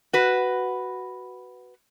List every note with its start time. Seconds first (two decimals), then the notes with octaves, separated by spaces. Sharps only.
0.13 F#4 B4